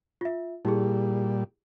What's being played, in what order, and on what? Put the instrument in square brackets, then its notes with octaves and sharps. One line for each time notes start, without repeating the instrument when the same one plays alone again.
[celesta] F4 E5
[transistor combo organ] A#2 G3 [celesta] E4 G4 G#4